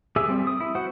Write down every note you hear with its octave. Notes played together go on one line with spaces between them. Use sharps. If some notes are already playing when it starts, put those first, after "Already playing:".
G4 G#4 E5 G#5 E6
G3 C4
D#6
E4
F#4 C5 F#5